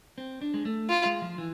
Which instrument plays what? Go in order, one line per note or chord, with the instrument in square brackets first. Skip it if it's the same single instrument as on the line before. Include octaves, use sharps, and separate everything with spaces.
[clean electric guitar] C4
D4
G#3
A3
[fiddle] F4
[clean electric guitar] G#3
F3
E3